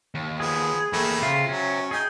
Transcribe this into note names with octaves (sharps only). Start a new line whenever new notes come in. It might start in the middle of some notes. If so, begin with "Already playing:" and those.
D#2
F3 B3 G#4
E2 A3 A#3 G4 B5
C#3 F4 C5 E5
F#3 C#4
D#4 G#4 G5 G#5